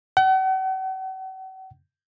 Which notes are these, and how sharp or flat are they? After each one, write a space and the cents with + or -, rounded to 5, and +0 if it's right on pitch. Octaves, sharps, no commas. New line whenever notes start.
F#5 +40